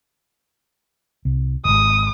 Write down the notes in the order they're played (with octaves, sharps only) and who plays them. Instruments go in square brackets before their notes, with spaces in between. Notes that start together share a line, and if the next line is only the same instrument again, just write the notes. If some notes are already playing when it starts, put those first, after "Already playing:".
[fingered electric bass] C2
[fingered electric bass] D#1 G#1 [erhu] D#6